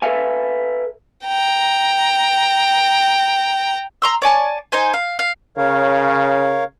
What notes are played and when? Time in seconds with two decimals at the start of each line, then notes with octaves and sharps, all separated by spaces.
0.02 A4 B4 D5 E5 F5 G#5
1.24 G5 A#5
4.02 A#5 C6 E6
4.22 C#5 D5 G#5 A5
4.72 D#4 C5 G#5
4.94 F5
5.19 F5
5.57 C#3 A#4 C#5 F5